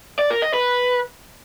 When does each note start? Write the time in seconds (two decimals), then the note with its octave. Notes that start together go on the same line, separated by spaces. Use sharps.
0.19 D5
0.30 A#4
0.42 D#5
0.54 B4